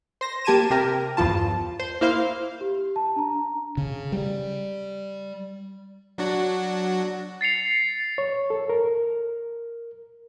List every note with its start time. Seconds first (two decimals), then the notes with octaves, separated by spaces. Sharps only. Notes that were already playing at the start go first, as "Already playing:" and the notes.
0.21 C5 A#6
0.45 A#3 G4 A5 G#6 D#7 E7
0.70 C3 G4 A#4
1.17 E2 G2 F3 F4 A5
1.79 C5
2.01 A#3 E4 C5 F5
2.61 G4
2.96 A5
3.16 D4 A#5
3.77 C#3
4.12 G3
6.18 F#3 D4 F#4
7.41 A6 C7 C#7 F7
8.18 C#5
8.50 A4
8.70 A#4